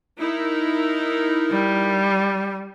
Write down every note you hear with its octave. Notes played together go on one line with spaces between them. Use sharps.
D#4 E4 A#4
G3